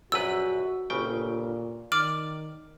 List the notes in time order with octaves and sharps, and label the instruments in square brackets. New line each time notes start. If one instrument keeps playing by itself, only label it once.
[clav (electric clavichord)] A#1 F#2 B4 [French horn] F#4 [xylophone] E6
[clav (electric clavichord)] G1 C#3 G5 [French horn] A#2
[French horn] D#3 [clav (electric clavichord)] D5 [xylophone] D6 F6